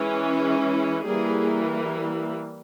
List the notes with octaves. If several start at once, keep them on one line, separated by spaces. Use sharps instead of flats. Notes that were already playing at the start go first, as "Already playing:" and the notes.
Already playing: E3 G#3 C#4
E3 G3 A#3 G#4